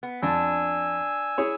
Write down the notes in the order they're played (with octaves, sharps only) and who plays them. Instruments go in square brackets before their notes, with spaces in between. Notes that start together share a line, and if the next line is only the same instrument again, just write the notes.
[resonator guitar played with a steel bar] B3
[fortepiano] F2 [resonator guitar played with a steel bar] D4 [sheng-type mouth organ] G#5 E6
[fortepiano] E4 G#4 C#5